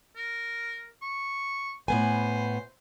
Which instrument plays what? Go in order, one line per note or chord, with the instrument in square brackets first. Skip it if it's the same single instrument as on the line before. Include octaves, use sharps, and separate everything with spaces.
[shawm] A#4
C#6
[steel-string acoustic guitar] A2 B3 G#5 [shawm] C5